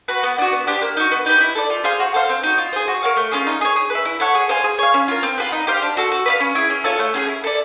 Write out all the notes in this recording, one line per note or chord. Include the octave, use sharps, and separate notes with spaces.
F#4 B4
B3
D4 F#4
B3
D4 G4 C5
A#3
D#4 F#4
B3
D#4 G4 B4
E4
A4 D5
F4
G#4 C5 F5
F#4
A4 C5 F5
C4
D#4 F#4
F4
G#4 C5
F#4
A#4 C#5 F5
A3
C#4 F4 G#4
D#4
G#4 C#5
G#4
B4
E5
E4
A4 C#5 F#5
G#4
C5 F5 G#5
G#4
C#5 F5
C#4
F4 A#4
C4
F4 G#4 B4
D#4
G4 C5 F5
D4
F#4 A4
F#4
B4 D5 F5
C#4
E4 G#4
C#4
F4 A4 C#5
A3
C#4 F4 G#4
E4
A4 D5